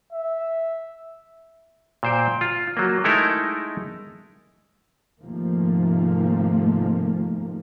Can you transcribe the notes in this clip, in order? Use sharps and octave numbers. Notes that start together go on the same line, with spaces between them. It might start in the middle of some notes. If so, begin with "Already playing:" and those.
E5
A#2 C5 G5
F4
F#3 A#3
G#3 A3 D#4 E4 A4 A#4
G#2 C3 D#3 F3 A3 A#3